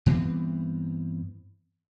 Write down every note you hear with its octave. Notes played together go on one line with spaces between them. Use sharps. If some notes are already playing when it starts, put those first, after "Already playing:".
G2 E3 B3 C4